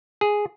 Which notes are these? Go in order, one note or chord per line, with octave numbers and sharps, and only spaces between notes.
G#4